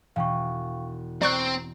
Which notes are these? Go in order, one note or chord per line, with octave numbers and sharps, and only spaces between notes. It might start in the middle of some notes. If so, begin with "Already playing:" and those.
E1 F5 G5 C#6
C4 D5 A#5 C#6 F#6